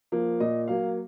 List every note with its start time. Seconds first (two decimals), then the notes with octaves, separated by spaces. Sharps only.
0.12 F3 A#3
0.40 A#2 D#5
0.68 F#3 A#3 F5